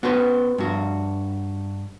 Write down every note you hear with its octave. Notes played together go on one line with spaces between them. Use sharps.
B3 F#4 B4 C5
G2 F#4